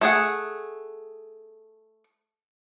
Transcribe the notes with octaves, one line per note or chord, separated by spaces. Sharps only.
A3 G#4 F#5